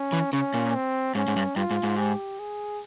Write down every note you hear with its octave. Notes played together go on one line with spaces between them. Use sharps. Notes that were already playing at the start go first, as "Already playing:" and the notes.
Already playing: C#4
E3
C#3 C#4
A#2
C4
G#2 C#4
G#2
G2
G2 F4
G#2
G#2
G4
G#4